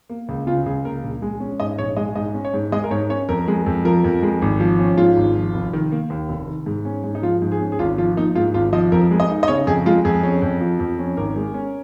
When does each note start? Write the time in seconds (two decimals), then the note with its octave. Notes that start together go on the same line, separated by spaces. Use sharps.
0.09 A#3
0.29 C#2
0.47 C#3 F4
0.66 C#2 G#4
0.84 A#3 A#4
1.03 A#1
1.22 G#3
1.40 C#4
1.60 G#2 D#5
1.78 A#1 C#5
1.97 G#3 D#5
2.16 G#2 D#5
2.34 C#4
2.45 C#5
2.54 G#2
2.72 G#3 D#5
2.84 A#4
2.91 G#2 C#5
3.10 C#4 C#5
3.29 F2 A#4
3.48 G#3
3.66 F2
3.85 F3 A#4
4.04 F2
4.23 G#3
4.42 G#1
4.60 F3
4.79 C#4
4.97 G#2 F4
5.17 G#1
5.35 F3
5.54 F1
5.73 D#3
5.92 A#3
6.10 D#2
6.29 F1
6.47 D#3
6.66 G#2
6.85 C#4
7.04 G#2
7.15 D#4
7.22 F3 F4
7.42 G#2
7.52 G#4
7.60 C#4
7.72 G#4
7.79 G#1 F4
7.98 F3 F4
8.16 A#3 D#4
8.35 G#2 F4
8.54 G#1 F4
8.72 F3 D#5
8.92 F2 A#4
9.11 G#3
9.20 D#5
9.30 D#4
9.43 D#5
9.48 C#3 C#5
9.67 F2 G#4
9.86 G#3 F4
10.05 F2 G#4
10.23 C#4
10.42 F2
10.61 F3
10.79 F2
10.99 C#4
11.17 G#1 A#4
11.36 G#3
11.54 C#4